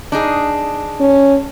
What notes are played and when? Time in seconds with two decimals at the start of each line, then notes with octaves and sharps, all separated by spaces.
0.12 D4 D#4 G#4
1.00 C#4